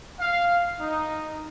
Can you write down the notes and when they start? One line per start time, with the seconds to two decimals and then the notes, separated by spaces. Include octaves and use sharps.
0.19 F5
0.80 D#4